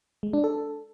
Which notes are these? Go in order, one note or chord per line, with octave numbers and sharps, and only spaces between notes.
G#3
D4
A4